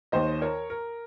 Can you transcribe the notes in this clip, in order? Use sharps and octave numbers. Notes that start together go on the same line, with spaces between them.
D#2 D#3 C5 D#5
A#4 C#5
A#4